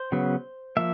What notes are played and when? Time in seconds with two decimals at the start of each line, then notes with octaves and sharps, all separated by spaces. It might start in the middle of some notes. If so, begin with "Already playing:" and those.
Already playing: C5
0.12 C#3 F#3 B3
0.77 F3 A#3 E5